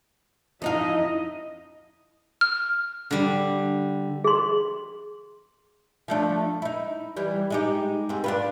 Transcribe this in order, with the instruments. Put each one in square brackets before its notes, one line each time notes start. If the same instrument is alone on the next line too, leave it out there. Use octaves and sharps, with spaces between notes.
[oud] F2 D#4 F5 [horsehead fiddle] E4 D#5
[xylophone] F6
[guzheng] D3 G3
[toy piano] G#4 C6
[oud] F3 A3 D4
D#4 E4
E3 G3
G#3 D#4 G4
G#2 C4
D4 F4 B4